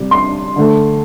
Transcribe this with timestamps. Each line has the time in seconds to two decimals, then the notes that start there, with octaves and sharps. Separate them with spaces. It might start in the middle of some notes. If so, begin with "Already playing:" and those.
Already playing: C3 G3
0.11 C6
0.56 D3 A3